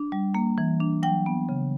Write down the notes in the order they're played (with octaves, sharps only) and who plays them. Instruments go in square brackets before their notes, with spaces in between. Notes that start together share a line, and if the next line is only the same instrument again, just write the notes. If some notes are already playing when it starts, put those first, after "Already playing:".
Already playing: [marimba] D4
G3
A#3
E3
D4
F#3 G5
B3
C#3